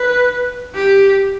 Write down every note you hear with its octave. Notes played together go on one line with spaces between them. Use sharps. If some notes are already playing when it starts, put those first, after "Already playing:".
Already playing: B4
G4